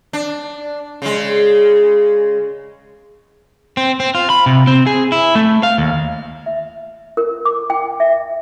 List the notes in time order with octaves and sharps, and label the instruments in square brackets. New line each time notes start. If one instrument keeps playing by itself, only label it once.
[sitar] D4
C#3 G#3
[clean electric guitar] C4
C4
F4
B5
C3
C4
G#4
E4
A3
F5
D#2
[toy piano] E5
A#4
D6
G5
E5